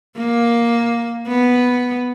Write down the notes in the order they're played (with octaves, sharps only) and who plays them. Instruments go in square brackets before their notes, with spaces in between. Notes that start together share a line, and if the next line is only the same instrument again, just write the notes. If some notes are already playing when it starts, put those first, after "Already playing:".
[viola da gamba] A#3
B3